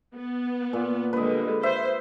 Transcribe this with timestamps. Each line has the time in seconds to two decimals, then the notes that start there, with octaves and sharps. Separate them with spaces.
0.14 B3
0.73 A#2
1.13 D3 G3 G#3 B4 D#5
1.63 C5 E5